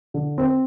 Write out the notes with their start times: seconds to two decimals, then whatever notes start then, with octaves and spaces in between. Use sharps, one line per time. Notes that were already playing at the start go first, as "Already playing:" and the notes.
0.14 D3
0.38 C4